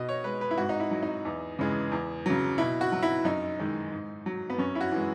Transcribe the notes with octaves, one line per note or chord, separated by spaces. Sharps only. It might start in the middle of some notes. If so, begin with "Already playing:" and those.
Already playing: B2 D#5
C#5
G#3 B4
B4
E4
G#2 F#4
D#4
E4
F#3
D#4
E2
C#3 E3 G#3
E2
C#3 F#3
B2 E4
F#4
F#3
E4
F#2 D#4
D#3 G#3
G#2
F#3
B3
F#2 C#4
E4
F#4
E3 G#3